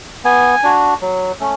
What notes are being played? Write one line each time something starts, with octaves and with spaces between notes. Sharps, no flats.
B3 G#5
D4 F#4
F#3
A3 C#4